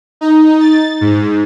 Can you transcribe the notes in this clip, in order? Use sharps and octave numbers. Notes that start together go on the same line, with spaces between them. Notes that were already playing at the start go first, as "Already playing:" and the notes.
D#4
A6
G#2